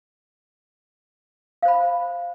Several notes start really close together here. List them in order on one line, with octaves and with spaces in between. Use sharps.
F5 C5 B5